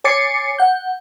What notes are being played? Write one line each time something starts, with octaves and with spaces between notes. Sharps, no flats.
C#5 G#5 D6 A6 C7 C#7
F#5 G6